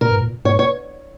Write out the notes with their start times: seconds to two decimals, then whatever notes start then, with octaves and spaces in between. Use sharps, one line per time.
0.01 A#2 A#4
0.11 G#2
0.21 A#2
0.45 G#2 C#5
0.59 C#5